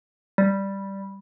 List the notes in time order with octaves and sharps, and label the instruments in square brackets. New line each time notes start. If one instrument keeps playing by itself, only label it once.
[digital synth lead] G3